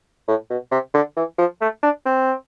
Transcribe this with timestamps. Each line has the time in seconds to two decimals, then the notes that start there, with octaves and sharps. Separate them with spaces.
0.28 A2
0.50 B2
0.71 C3
0.94 D3
1.17 E3
1.38 F3
1.61 A3
1.83 D4
2.05 C4